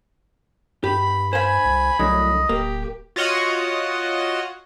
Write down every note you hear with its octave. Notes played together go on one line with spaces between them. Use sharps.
G2 G4 B5
C5 F5 G#5 B5
C2
C2 F#2 A2 D3 D#5
D1 A#3 G4
F4 F#4 C#5 D#5 F#5